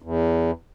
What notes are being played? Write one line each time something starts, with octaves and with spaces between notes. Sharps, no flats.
E2